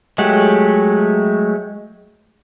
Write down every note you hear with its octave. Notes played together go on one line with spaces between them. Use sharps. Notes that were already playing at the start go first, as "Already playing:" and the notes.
F#3 G#3 A3 G4 F#5